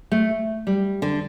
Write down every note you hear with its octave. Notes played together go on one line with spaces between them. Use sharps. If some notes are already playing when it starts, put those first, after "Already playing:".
A3
G3
D3